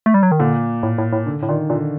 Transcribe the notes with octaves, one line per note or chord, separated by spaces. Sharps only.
A3
G3
F#3
D#3
A#2 D3
A2
A2
A2
D3
A2
A#2 D#3
A#2 D3